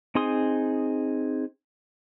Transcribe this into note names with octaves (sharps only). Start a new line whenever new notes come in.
C4 D#4 G#4 C6 D#6